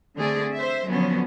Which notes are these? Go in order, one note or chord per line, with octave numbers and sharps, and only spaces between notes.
D3 A3 C4 G#4 D5
C5 E5
D3 F3 F#3 B3 C#4